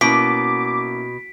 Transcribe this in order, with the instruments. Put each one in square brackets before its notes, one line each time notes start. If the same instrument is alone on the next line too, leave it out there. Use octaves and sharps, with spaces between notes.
[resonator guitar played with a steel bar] B2 [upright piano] A#3 C#4 E4 [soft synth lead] D6 [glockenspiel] B6 D7